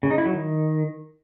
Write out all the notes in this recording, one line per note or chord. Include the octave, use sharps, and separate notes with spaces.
C#3
D#4
E4
F#3
D#3